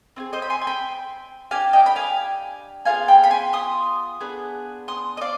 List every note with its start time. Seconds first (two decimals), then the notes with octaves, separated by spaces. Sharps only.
0.16 C4 F4 G#4
0.33 C5 D#5
0.42 B5
0.50 G#5 C6
0.61 G#5
0.67 G5 B5
1.51 D4 G4 F5 G#5
1.73 D#5 G5
1.86 B5
1.96 F5 G#5
2.85 B3 D4 F4 G#4 F5 G#5
3.08 G5 B5
3.24 B5
3.30 G#5 C6
3.53 C6 D#6
4.20 B3 D4 G#4
4.88 C6 D#6
5.17 D#5
5.21 D5 F5